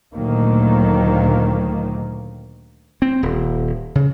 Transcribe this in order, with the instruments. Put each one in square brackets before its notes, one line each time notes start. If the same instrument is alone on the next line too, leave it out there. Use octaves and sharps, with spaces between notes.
[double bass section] D2 A#2 D#3 F#3 A#3
[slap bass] C4
D#1
C#3